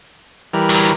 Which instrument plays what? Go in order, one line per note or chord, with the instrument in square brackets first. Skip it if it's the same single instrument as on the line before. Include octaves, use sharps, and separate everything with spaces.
[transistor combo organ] E3 G3 A#4
[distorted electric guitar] D2 F#3